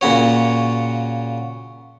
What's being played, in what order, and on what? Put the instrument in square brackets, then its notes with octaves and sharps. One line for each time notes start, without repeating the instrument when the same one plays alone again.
[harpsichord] A#2 C#3 F#4 C#5